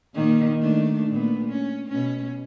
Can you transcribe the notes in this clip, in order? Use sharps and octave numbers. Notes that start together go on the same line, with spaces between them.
A#2 D#3 A#3
D#3 A3 D4
A#2 B3
C#4
B2 C#4